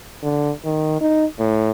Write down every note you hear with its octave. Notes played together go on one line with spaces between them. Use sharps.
D3
D#3
D#4
A2